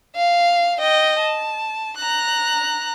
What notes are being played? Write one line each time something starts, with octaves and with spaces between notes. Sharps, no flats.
F5
D#5 G5
A5
A#5 F#6